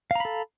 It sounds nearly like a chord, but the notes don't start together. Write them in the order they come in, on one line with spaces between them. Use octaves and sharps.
F5 A#5 B5 A4